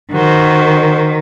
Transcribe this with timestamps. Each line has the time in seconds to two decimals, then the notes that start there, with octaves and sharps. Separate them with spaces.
0.13 D#3 F#4 C5